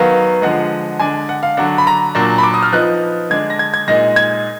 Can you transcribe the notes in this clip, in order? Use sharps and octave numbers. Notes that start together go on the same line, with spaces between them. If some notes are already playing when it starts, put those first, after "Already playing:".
Already playing: D#3 F#3 B3 F5
D3 F3 G#3 F#5
D3 G#3 D4 G#5
F#5
F5
D3 F#3 D4 F#5
B5
A#5
A#2 F#3 D4
B5
D6
D#6
F6
F3 B3 D#4 F#6
D3 G#3 D4 G#6
A#6
G#6
G#6
A#2 G#3 D#4 A#6
G#6